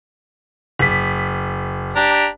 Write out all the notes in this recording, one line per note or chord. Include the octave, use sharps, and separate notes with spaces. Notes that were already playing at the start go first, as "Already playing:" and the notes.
F#1 B6
D4 G4 A#5